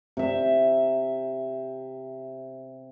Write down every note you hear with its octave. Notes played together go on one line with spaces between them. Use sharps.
C3 E5